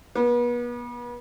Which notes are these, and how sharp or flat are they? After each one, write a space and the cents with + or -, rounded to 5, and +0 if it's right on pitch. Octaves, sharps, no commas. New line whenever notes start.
B3 -35